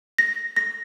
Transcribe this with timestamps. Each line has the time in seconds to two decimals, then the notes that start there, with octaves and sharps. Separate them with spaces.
0.18 A#6
0.56 A#6